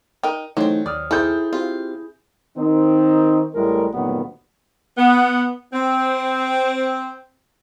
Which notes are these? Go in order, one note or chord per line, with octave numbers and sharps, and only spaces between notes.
D#4 A#4 G5
E3 F#3 A3 C4 D#4 F#4 G#4 C5
D#2 D5 D#6 F6
D#3 E3 C4 E4 G#4 A4 G6
C4 F4 G4
D#3 C4 D#4
A1 A2 G3 G#3 A#4
D2 G2 A#2 D#3 F#3 B3
B3
C4